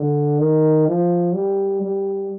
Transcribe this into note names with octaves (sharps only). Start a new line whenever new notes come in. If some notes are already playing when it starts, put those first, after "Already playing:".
Already playing: D3
D#3
F3
G3
G3